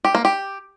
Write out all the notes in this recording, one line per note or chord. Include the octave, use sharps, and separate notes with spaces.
G4
A#3
G4